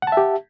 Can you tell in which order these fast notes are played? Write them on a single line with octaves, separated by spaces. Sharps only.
F#5 A5 E5 G4